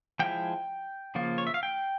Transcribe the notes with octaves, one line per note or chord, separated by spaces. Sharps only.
F3 G#3 E4 G5
C#3 F3 A#3 F4
C#5
E5
F5
G5